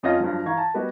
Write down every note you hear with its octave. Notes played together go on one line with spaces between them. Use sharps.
F2 C#4 F4 D#5 D#6 A#6
G2 F3 F#3
E3 F5 A#5 C#6 G#6
A5
G3 B3 F#4 G4 B4 D#5